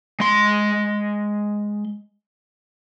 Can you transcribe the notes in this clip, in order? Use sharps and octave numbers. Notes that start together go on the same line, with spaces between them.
G#3 C6